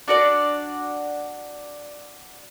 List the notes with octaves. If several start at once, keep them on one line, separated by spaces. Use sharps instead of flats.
D4 F#4 D5